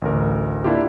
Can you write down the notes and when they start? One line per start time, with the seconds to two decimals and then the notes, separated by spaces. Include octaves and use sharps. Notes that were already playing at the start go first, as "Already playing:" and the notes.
0.02 A1 D2 A#4
0.64 A#3 D4 E4 F4 G4